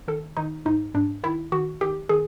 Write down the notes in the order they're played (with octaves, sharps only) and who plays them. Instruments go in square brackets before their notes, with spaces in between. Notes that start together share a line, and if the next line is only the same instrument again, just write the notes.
[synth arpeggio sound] D#3 A4
D#3 D#4
G#2 D#4
G#2 D4
D#3 E4
D#3 F#4
D#3 G4
D#3 G#4